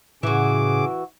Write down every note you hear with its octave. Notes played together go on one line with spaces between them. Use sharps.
A2 C#3 E3 F#4 G#4 D6